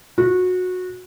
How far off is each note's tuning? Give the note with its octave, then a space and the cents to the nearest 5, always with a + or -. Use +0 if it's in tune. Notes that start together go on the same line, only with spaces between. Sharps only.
F#4 -20